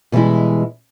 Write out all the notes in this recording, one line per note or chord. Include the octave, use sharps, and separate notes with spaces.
B2 E3 G3 G#3 E4